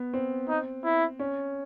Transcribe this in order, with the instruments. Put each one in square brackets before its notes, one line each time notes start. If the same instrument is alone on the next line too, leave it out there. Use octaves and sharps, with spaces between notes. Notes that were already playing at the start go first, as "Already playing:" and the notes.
Already playing: [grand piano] B3
C4
[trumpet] D#4
E4
[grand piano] C#4